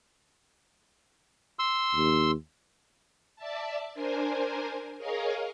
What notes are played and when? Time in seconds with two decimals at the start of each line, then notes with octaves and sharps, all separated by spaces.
1.59 C6 E6
1.95 D#2
3.36 D5 E5 A5
3.94 D4 A#4 C5 G#5
4.98 G#4 A#4 C#5 D#5 F5